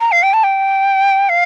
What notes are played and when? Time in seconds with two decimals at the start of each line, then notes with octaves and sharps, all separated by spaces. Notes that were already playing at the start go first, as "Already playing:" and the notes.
0.01 A#5
0.12 F5
0.23 G5
0.33 A5
0.43 G5
1.29 F5